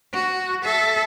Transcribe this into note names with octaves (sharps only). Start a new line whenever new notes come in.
F#4
A4 E5